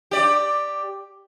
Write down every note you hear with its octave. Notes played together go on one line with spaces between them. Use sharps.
G4 D5